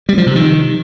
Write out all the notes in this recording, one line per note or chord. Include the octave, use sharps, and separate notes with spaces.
G3
F3
C3
D#3